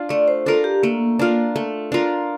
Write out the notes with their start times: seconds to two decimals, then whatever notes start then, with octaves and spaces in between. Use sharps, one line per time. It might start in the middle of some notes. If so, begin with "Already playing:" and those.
Already playing: D4 F4
0.09 A3 D5
0.28 C5
0.46 D4 F4 A4 A#4
0.64 G4
0.83 A3 A#3
1.19 D4 F4 A#4
1.56 A3
1.92 D4 F4 A#4